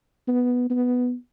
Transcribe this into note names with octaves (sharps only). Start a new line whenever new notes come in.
B3
B3